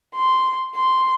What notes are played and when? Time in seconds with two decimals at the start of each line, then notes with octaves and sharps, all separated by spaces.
0.16 C6
0.76 C6